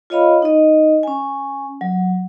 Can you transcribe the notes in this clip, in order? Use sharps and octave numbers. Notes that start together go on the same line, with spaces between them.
F4 C#5 D#5 F5 B5
D#4 D#5
C#4 G#5
F#3